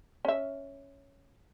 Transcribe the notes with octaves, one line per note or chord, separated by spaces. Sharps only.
C#4 E5